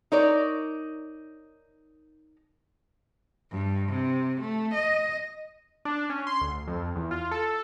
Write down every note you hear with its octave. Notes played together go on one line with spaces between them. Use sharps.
D#4 A#4 C#5 D5
G2
C3
A3
D#5
D4
C#4
C6
D2
F2
E2
F4
A4